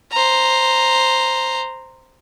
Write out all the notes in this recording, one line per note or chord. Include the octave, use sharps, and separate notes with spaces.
C5 A#5